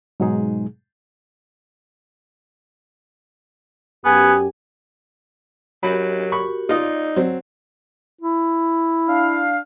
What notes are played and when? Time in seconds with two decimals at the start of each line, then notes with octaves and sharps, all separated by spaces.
0.20 G#2 B2 F#3 G#3 D#4 G#4
4.05 F#2 B3 G4 G#5
5.83 F#3 F#4 G4 A#4 B5
6.32 B5 C#6
6.69 D#4 F4 D5 D#5
7.16 F#3 C4
8.21 E4
9.08 D4 F5